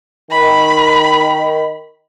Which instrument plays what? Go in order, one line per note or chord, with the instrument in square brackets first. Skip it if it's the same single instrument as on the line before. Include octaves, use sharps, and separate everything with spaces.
[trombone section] D#3 [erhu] B5